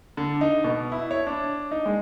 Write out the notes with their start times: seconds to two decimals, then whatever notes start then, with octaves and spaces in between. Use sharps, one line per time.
0.17 D3
0.41 D#4
0.64 B2
0.92 E4
1.11 C#5
1.27 D4
1.71 D#4
1.86 G#3